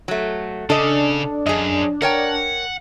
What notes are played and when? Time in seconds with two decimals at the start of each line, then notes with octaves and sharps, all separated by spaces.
0.08 F#3 A3
0.70 C#3 D4 A4 D#5
1.46 F#2 G#4 D#5
2.02 A#4 C#5 F#5 G5